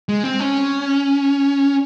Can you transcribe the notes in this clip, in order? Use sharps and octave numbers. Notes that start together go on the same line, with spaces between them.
G#3
C4
C#4